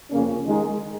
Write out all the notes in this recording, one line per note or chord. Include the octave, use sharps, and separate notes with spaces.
F2 C#3 A#3 C#4
D#3 G#3 D#4 G#4